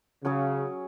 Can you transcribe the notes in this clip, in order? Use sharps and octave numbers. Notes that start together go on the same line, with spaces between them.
C#3 F#3 C#4 G#4